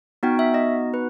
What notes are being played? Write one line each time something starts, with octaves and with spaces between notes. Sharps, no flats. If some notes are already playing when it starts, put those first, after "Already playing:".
B3 D#4 F#4 G5
E5
D#5
B4